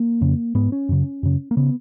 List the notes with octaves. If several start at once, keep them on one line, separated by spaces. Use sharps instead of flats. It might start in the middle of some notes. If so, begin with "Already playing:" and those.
Already playing: A#3
F2 C#3
G#2 B3
C#4
F#2 C#3
F#2 C#3
A#3
C#3 B3